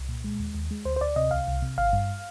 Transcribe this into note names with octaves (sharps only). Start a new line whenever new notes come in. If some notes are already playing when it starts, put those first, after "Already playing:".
Already playing: C2
A#2
G#3
D#2
D#2
G#3
D2 C5
C5
D2 D5
C3 D#5
C2 F5
C2
C3
G#1 F5
G2